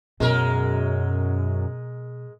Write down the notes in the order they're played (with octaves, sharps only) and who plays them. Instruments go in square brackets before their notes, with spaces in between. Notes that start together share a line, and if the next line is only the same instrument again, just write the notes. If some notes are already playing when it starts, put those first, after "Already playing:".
[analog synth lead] F#2 [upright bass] B2 [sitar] G#3 A#4